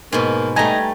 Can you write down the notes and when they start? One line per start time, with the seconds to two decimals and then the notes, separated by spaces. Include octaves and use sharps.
0.12 G#2 B2 A#3
0.56 G3 A3 D#4 G#5 A#5